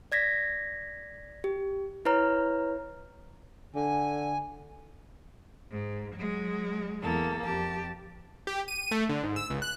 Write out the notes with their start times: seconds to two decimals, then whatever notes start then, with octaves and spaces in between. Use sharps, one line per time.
0.12 D5 G#6 A#6 B6
1.44 G4
2.05 E4 B4 C#5 A#5 F6
3.75 D3 G#5
5.71 G#2
6.15 F#3 G#3
7.02 E2 A#3 A4
7.45 F2 G4 A5
8.47 G4
8.68 D#7
8.91 A3
9.09 D3
9.23 G#2
9.36 E6
9.50 C#2
9.62 F#6